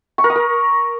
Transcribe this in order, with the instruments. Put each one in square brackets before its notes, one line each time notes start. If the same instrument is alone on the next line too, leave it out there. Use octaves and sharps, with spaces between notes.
[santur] C#6
A#4
D#6
A#4